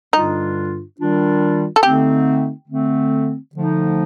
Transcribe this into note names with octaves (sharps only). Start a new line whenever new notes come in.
G2 D3 G3 D4 D#4 F4
D#3 G3 D4 F4
A4
D3 A3 C4 D#4 G4
D3 A3 C4
D3 F3 A3 D#4